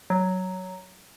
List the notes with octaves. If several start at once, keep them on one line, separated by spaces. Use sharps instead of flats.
F#3